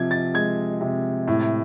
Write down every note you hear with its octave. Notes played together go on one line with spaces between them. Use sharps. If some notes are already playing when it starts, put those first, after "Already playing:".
Already playing: C3 F3 G#6
A6
G#3 G#6
C3
A2